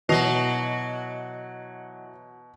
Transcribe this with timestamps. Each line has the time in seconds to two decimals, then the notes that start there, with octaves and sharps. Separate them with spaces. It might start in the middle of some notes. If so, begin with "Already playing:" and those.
0.09 B2 E3 F#3 D#5 C7 F7